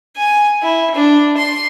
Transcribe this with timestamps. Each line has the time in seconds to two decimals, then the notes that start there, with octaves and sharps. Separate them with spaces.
0.17 G#5
0.63 E4
0.95 D4
1.37 C6